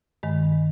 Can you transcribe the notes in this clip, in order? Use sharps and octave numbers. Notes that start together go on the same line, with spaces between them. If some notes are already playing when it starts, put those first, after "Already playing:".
G2 D#3 G#3